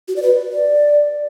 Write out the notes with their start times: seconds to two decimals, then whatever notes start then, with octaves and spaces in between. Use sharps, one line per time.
0.08 F#4
0.16 D5
0.22 B4
0.52 D5